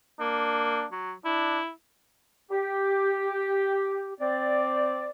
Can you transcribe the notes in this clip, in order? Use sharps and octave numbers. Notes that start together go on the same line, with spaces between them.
A#3 D4
F#3
D4 E4
G4
C4 D5